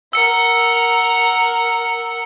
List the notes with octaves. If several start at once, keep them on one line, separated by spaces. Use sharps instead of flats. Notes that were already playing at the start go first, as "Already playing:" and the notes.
A#4 F#5 E6 C#7